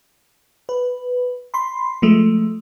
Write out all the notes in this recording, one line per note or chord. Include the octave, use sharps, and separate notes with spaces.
B4
B5 C6
F3 G#3 A3